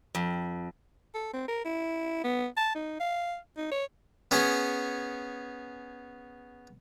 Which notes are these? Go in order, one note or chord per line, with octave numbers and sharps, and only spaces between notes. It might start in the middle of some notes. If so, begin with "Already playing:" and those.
F2
A4
C4
A#4
E4
B3
A5
D#4
F5
D#4
C#5
B3 C#4 G#4